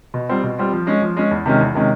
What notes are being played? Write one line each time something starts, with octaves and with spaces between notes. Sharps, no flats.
B2
G3 C4 F4
B2
G3 C4 F4
F3
G#3 C#4
F3
G#3 C#4
E2
C3 D#3 G#3 C#4
E2
C3 D#3 G#3 C#4